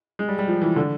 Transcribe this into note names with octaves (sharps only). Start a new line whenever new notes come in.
G#3
G3
G3
F3
E3
D3